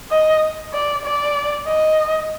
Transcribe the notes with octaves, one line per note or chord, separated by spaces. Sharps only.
D#5
D5
D5
D#5